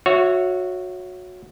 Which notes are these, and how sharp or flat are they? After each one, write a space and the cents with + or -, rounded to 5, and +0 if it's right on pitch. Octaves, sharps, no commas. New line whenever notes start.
F#4 -20 C#5 +0 E5 +5